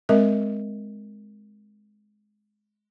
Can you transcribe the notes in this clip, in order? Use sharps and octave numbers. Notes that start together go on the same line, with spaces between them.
G#3 C4 A#4 D#5 E5